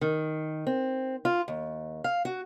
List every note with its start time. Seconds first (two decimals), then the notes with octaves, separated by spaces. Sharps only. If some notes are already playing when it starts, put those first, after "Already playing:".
0.01 D#3
0.67 C4
1.25 F4
1.48 D#2
2.04 F5
2.25 F#4